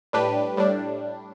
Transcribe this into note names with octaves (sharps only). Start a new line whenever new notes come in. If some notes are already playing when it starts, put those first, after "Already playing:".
A2 G3 D4 G4 B4
A2 G3 D4